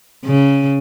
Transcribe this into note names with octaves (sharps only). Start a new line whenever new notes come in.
C#3